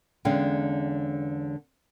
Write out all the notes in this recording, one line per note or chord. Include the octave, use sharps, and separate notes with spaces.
E2 D3 G#3 C#4 F5 G5